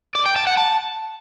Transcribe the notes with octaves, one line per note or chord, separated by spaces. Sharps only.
D5
G5
A5
F#5
A5